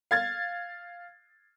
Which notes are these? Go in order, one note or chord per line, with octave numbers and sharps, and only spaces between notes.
F5 G#6 A6